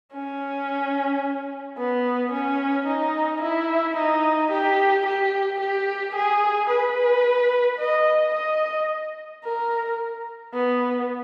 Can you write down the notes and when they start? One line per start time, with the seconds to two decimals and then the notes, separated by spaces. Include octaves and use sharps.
0.13 C#4
1.77 B3
2.32 C#4
2.87 D#4
3.42 E4
3.96 D#4
4.51 G4
5.06 G4
5.60 G4
6.15 G#4
6.70 B4
7.79 D#5
8.34 D#5
9.44 A#4
10.53 B3